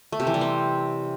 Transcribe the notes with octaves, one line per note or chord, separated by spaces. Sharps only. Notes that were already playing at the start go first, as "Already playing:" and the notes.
A3
C3
E3
G3
C4